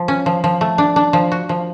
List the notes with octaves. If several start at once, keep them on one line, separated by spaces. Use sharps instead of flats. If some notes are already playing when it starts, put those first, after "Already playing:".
Already playing: F3
C#4
F3
F3
A3
D4
D4
F3
F#4
F3